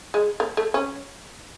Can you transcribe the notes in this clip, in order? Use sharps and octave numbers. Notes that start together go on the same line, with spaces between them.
G#3
A#3
A3
C#4